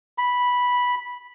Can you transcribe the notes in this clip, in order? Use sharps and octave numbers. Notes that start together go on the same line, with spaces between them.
B5